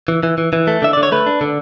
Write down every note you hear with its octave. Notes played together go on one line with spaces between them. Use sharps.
E3
E3
E3
E3
A3
D3 E5
D3 D5
C#5
A3 B4
D4
D3